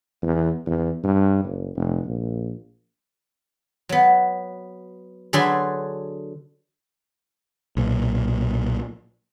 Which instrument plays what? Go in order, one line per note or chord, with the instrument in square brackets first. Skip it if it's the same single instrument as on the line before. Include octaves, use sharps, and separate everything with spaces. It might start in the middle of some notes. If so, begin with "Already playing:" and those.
[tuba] E2
E2
G2
F#1
F1
A#1
[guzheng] F#3 B3
D3 F#3 G#4 A4 B4 C6
[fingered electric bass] B1 A#2